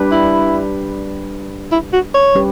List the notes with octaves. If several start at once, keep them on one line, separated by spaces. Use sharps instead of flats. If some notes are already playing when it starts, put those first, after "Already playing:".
Already playing: G3 D4 G4 B4
E4
E4
F#4
C#5
G3 C#4 G4 B4